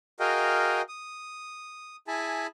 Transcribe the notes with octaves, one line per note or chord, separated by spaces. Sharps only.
F#4 G#4 A#4 D#5 F5 G5
D#6
E4 G#4 G#5 A5 B5